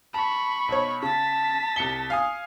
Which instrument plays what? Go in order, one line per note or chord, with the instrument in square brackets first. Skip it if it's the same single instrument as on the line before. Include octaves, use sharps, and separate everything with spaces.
[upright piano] A5 [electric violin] B5 C#6
[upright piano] B1 C#5
[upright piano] C#3 [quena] A5 [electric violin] A6 B6
[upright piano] C2 C#7 G7
F5 G#5 D#6